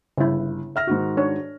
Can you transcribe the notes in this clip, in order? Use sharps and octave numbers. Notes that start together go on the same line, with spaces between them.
G1 C#3 E4
E5 F6 A#6
G#2 D#3 F#4
D4 C#5